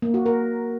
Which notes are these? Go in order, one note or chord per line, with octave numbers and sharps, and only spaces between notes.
A#3
F#4
A#4